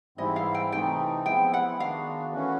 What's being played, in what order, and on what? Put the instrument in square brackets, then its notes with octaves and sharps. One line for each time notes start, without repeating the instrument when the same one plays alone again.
[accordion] G#2 E3 G3 C4 E4 [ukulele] D#5
[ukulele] F5
G5
[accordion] C3 E3 A3 C4 D#4 [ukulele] G5
[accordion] F3 G#3 B3 E4 [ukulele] G5
[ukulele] F#5
[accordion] D#3 G#3 B3 D4 F#4 [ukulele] F5
[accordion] E3 A3 C#4 F#4